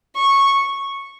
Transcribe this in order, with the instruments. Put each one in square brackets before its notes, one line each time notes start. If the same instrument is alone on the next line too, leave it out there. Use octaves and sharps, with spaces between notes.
[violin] C#6